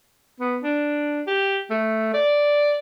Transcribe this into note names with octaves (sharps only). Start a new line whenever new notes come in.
B3
D4
G4
A3
D5